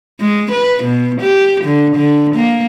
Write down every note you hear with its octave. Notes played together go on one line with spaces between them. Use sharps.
G#3
B4
B2
G4
D3
D3
A#3